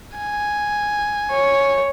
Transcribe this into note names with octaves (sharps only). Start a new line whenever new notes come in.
G#5
C#5